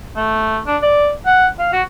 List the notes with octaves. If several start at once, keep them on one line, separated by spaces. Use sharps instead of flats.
A3
D4
D5
F#5
F5
F#4